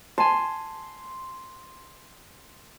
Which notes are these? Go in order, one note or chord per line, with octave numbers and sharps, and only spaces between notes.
G#5 A5 C6